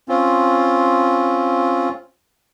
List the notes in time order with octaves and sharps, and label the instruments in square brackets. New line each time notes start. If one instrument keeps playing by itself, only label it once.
[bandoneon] C4 C#4 F4